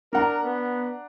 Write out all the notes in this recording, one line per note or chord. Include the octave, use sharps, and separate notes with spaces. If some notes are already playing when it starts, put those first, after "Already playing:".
D4 A#4 F#5 A#5
B3